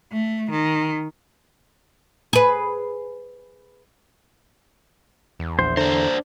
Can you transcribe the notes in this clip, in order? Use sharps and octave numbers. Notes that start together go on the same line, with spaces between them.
A3
D#3
G#4 B4
E2
A#1 C5
D3 D4 C5 A#5